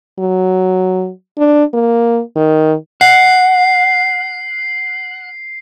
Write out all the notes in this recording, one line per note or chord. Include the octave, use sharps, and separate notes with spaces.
F#3
D4
A#3
D#3
F#5 C7